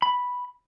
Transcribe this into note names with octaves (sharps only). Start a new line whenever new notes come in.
B5